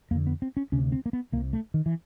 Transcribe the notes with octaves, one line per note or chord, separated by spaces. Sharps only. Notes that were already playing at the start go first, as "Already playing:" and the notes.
F2 D3 A#3
B3
C4
C#4
D2 C3 C#4
C4
A#3
B3
C2 C3 A#3
A3
D#3
E3